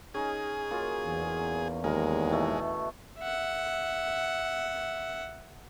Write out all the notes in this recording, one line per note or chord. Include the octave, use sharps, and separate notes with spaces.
C#4 D#4 G#4
F#3 A#3 F4
E2
D#2 G#3 A#4
B2 E3 A3
E5 F#5